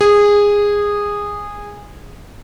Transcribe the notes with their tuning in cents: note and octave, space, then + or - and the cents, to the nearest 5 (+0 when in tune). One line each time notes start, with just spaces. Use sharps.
G#4 -15